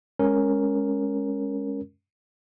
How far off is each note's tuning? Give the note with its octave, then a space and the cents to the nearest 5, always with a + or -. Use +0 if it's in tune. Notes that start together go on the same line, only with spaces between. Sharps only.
G#3 +0 C#4 +0 A#4 +0